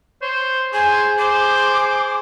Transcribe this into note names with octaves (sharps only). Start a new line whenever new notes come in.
C5 C#5
G#4 C5 G#5
C5 D6